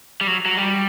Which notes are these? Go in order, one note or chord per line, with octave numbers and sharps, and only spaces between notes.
G3
F#3
F#3
G3